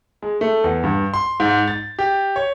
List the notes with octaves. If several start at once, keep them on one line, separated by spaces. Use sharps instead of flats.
G#3
A3
E2
G2
C6
G#2
A6
G4
C#5